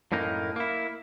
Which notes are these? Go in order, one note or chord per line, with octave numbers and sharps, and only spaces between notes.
F#2 A2 A#3 D#4
A#3 E4